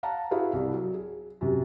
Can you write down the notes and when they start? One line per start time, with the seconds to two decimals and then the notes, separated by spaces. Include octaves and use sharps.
0.03 F5 F#5 A5 A#5
0.31 E4 F#4 G#4 B4 F5
0.53 C2
0.74 F#3
0.94 G#4
1.41 F#2 C3